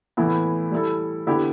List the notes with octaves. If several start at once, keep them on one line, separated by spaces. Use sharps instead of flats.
A2 E3 B3 E4
G3 E4 A4
D3 B3 E4 G4